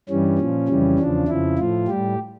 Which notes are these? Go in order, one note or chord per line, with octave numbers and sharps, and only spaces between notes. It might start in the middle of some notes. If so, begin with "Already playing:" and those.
G2 E3 G3 C#4
A#2 F3
F2 C#3 E3 G3
E2 C#3 F3 D4
F2 C#3 F3 E4
A2 F3 F4
A2 G3 G4